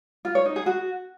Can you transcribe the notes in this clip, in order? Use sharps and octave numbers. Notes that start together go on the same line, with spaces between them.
F4
C#5
D#4
G#4
F#4